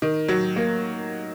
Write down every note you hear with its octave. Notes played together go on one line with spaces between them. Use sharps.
D#3
F#3
A#3